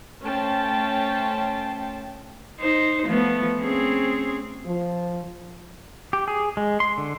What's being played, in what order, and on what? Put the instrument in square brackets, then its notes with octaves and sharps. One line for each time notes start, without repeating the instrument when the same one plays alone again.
[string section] A3 C#4 C5 G5 A5
[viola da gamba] D#4 C5
F3 A3 B3
C4 C#4 G#4
[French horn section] F3
[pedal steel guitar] G4
G#4
G#3
C6
D3